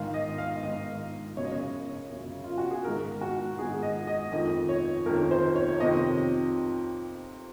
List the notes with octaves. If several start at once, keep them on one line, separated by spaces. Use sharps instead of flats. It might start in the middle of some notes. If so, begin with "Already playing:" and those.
Already playing: G#2 D#3 F5
D#5
F5
G#2 D#3 D#5
F#2 C#3 C#5
D#5
C#5
F#2 C#3
F4
F#4
G#4
G#2 D#3 A#4
F#4
G#2 D#3 G#4
D#5
D#5
F2 D#3 D#5
C#5
F2 D#3 A#4
C5
C#5
C#5
F2 C3 D#3 D#5